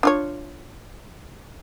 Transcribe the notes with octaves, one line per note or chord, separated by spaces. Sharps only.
D4 F4 C#5